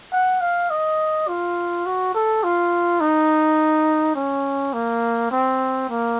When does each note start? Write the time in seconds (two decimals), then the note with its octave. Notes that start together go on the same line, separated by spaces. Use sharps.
0.13 F#5
0.41 F5
0.70 D#5
1.28 F4
1.86 F#4
2.14 A4
2.43 F4
3.00 D#4
4.15 C#4
4.73 A#3
5.31 C4
5.89 A#3